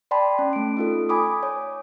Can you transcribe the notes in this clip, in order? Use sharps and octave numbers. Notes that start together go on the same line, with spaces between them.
D5 G5 A5 B5 C6
C#4
A3 D7
D#4 F4 A4
G#5 B5 D6 D#6
C#5